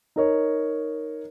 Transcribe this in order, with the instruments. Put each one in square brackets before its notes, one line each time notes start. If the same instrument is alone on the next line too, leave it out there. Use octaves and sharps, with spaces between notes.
[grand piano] D#4 A#4 C#5